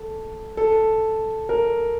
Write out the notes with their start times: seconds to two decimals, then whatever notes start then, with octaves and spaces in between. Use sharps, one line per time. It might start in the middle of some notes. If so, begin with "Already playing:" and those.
Already playing: A4
0.57 A4
1.49 A#4